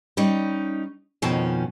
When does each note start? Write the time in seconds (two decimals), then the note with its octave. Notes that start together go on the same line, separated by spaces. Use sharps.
0.17 G3 C#4 D#4
1.22 F2 B2 D#3 F3 C#4